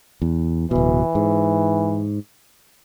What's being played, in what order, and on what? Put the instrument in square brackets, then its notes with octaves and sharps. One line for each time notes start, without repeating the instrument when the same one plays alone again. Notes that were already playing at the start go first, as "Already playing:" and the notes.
[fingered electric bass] E2
[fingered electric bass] D1 B2 [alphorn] E3
[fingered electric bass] G#2